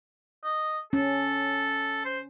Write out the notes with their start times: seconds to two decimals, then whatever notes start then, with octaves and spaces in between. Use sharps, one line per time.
0.44 D#5
0.93 C#4 A4
2.05 C5